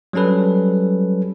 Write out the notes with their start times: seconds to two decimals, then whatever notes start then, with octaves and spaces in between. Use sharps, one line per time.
0.13 F#3 G3 C#4 A4 B4